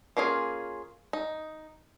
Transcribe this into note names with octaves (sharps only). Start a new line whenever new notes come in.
A#3 C#4 F4 G#4
D#4